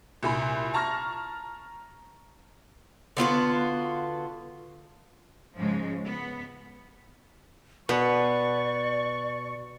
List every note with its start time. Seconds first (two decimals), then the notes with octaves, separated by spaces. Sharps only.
0.23 C2 A#2 G#5 B5
0.74 A5 A#5 C#6 F6 A#6
3.17 D3 B3 F4 F#4
5.58 G#2 C#3 F3 G#3
6.05 B3
7.89 B2 B4 D5 C#6